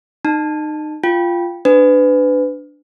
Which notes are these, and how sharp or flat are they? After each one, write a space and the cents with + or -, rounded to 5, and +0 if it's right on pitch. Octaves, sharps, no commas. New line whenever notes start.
D#4 -25 A5 +0
F4 -10 G5 +0
D4 +0 B4 +30